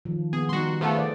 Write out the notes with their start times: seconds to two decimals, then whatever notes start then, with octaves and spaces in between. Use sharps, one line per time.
0.05 D#3 F3
0.33 B3 G#4
0.49 G3 D#4 F#4 C6
0.81 F3 A3 B3 G#4 C5
0.98 D5